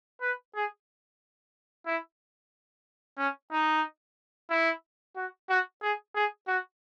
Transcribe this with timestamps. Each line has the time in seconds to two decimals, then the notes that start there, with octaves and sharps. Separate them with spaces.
0.21 B4
0.55 G#4
1.86 E4
3.18 C#4
3.52 D#4
4.50 E4
5.16 F#4
5.49 F#4
5.82 G#4
6.15 G#4
6.48 F#4